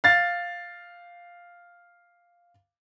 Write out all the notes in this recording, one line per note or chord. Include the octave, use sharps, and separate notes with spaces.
F5 A6